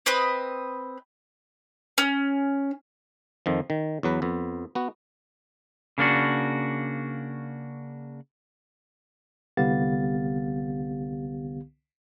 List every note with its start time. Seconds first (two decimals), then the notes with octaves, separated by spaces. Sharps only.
0.06 C4 B4 D#5
1.98 C#4
3.46 F2 D#3 F3
3.70 D#3
4.03 E2 F#3 B4
4.22 F2 B3
4.75 B3 F#4
5.98 C#3 A#3 D4 F#4
9.57 C2 D3 B3 G4 F5 A6